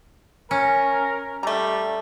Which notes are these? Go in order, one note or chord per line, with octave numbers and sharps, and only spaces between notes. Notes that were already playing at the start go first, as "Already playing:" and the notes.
C#4 A#4
G3 A3 A#5